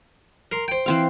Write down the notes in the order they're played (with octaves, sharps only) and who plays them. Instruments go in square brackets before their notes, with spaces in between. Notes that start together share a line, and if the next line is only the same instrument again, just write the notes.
[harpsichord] A#4 C6
C5 G5
[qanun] E3 C4 F5